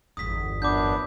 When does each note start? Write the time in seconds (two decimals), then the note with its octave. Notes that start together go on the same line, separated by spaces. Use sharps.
0.17 G1 E2 D#6 B6
0.62 F#2 B3 D4 D6 G6